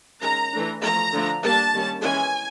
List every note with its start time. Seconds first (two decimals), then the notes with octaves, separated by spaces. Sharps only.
0.22 D#3 G#3 C#4 A#5
0.53 E3 A3 D4
0.83 F3 A3 C#4 A#5
1.13 D3 F3 A3 D4
1.43 G3 A#3 D4 A5
1.73 D#3 G3 A#3 C#4
2.03 E3 G#3 C#4 G#5